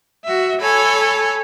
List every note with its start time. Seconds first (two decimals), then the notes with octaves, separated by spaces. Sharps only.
0.23 F#4 E5
0.60 A4 C#5 G#5 B5